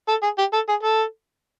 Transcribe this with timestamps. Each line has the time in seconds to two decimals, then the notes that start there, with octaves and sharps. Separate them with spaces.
0.09 A4
0.23 G#4
0.39 G4
0.54 A4
0.69 G#4
0.83 A4